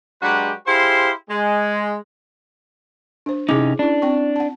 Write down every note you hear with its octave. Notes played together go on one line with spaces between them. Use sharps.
F#3 G#3 D4 F#4 G4 B4
E4 G4 G#4 C5 F5 C6
G#3
D4 C5
C3 C#4 D#4 E4 G#4 D6
C#4 D4 E4
C4 G5 C#6
F#5 A5